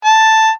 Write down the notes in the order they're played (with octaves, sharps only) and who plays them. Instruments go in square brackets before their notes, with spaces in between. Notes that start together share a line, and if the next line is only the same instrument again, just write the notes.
[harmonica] A5